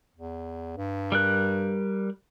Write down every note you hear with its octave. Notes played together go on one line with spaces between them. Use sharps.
E2
G2
G3 A#4 F#6